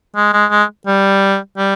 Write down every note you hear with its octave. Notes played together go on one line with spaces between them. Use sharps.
G#3
G#3
G#3
G3
G3